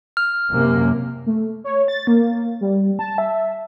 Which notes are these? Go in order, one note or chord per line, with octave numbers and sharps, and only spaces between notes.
F6
F#2 C3 A#3
A3
C#5
A6
A#3
G3
A5
E5